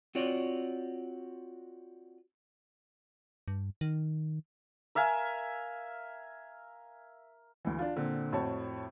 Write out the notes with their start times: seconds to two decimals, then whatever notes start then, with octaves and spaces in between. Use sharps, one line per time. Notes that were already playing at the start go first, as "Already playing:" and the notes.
0.15 C4 F4 F#4 C#5 D5
3.48 G2
3.81 D#3
4.95 A#4 E5 F5 G#5
7.65 D2 E3
7.79 D4 F4
7.96 A#2 D3 C4
8.32 F2 A2 F#4 C5 C#5 A5